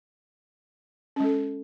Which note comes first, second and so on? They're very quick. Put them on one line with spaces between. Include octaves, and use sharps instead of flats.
C#4 G#3 A4